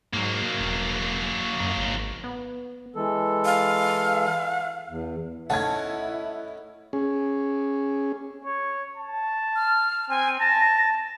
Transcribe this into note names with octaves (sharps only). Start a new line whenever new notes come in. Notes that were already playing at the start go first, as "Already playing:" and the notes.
G#2 F#3 A#3
E1
F#2
G#1
B3
E3 G#3 A4
F5
E2
A3 C#4 D#4 E4 F#5 A5 G#6
C#4 G#4
C#5
A5
F6
C4 G#5
A5 A#6